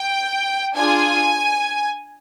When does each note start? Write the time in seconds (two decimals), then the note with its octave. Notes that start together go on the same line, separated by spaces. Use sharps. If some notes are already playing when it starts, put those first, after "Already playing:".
Already playing: G5
0.76 D4 F4 G#4 G#5